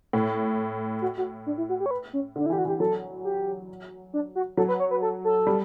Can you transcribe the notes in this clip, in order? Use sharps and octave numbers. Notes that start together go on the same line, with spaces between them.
A2
F#4
F#4
D4
E4
F#4
G4
C#5
B4
C#4
D3 D4
E4
E3 G4
F#4
E3 G4
F#3 A4
G4
D4
F#4
F#3 A4
B4
C#5
B4
A4
A4
G3